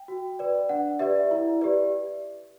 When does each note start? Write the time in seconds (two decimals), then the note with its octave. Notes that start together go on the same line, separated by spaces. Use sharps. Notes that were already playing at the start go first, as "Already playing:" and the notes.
Already playing: G5
0.08 F#4
0.39 B4 D5
0.69 D4 F#5
0.99 G4 B4 D5 E5
1.31 E4
1.61 G4 B4 D5